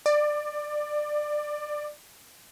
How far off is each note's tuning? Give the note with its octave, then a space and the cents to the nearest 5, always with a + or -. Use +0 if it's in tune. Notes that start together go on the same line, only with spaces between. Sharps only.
D5 +20